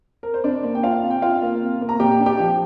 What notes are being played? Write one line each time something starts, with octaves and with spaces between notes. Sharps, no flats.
A#4
C5
C3 D4 D5
A#3
G5
D4 F4 F5
C3
G5
C3 F4 F5
A#3
C3
A#3
A#5
A#2 G4 G5
D4
G4 G5
F3